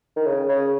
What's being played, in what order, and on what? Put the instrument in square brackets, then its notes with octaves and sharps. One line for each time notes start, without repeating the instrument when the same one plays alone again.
[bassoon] D#3
C#3
C#3